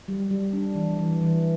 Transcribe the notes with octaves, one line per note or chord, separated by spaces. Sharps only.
G3
G3
D4
E3
E3
E3